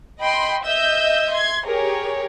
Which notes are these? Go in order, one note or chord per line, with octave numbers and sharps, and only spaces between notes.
D#5 G5 B5 C6
D#5 E5 E6 G6
C6 G#6
G4 G#4 A#4 C#5